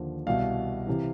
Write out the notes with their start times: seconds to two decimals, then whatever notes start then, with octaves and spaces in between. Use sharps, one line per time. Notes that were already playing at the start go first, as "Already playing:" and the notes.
Already playing: D#2 D3 F3
0.27 C2 B2 F5
0.87 C3 E3